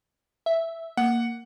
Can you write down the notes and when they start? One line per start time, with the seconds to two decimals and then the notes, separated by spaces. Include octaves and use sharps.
0.46 E5
0.97 A#3 F#5